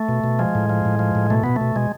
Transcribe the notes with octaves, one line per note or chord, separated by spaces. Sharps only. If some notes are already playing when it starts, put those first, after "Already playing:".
Already playing: A3
B2
B2
F3 G#3
A2
F3
A2
F3
A2
B2 A3
B2 B3
B2 A3
B2 G#3